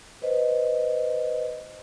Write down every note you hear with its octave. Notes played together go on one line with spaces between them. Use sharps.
B4 C5 D#5